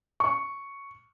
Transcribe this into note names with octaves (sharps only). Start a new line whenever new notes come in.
C#6